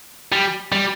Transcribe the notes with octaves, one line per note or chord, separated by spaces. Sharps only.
G3
G3